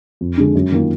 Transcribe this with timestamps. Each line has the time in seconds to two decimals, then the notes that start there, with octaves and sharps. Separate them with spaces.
0.21 F2
0.37 D3 G#3 D4
0.55 F#2
0.72 D#3 A#3 F4